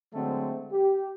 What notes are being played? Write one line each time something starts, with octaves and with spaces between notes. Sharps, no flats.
D3 F#3 G#3 A3 C4
G4